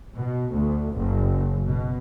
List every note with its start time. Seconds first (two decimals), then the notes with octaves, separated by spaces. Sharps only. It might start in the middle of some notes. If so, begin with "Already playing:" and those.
0.16 B2
0.51 D2
0.94 F#1
1.68 B2